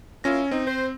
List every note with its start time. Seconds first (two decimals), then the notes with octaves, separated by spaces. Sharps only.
0.24 A#3 C#4 E4 F4 A#6
0.51 C4 D#4
0.66 C5